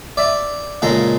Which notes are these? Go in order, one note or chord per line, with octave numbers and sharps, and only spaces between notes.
D5 E5
A#2 C#3 G#3 A4 A#5